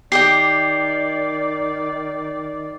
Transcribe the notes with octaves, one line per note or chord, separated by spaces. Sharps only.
D#3 G4 D5 D#5 G5 C7